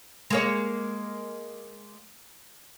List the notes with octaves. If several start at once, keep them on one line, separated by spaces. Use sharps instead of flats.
G#3 A#3 C#5